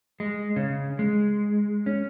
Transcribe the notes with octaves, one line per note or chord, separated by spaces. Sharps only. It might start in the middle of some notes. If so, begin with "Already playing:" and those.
G#3
C#3
G#3
C#4